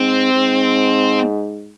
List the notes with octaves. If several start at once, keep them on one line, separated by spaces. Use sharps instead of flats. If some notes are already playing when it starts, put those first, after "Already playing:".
Already playing: G#2 C4
G#2